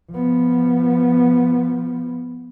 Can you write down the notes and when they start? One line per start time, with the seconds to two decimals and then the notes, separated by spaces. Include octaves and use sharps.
0.11 F3 B3